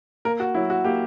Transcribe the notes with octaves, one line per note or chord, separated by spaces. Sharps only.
A#3 A#4
F#4
F#3 E4
F#4
A#3 G4